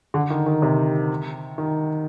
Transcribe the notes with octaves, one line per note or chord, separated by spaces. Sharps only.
D3
D#3
D#3
C3
D#3